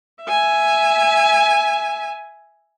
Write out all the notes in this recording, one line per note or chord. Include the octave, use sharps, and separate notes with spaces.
E5 G#5